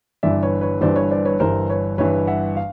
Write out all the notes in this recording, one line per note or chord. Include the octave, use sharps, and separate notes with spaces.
G1 G2 E3 D5 E5
B4 C#5
B4 C#5
G1 G2 E3 C5 D5
B4 C#5
C5 D5
B4 C#5
G1 G2 E3 A#4 C5
B4 C#5
G1 G2 E3 B4 C#5
E5 F#5
F5